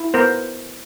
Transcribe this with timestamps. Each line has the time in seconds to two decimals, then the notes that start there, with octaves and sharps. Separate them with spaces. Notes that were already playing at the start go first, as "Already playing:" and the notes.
Already playing: E4
0.14 B3 A#4 C5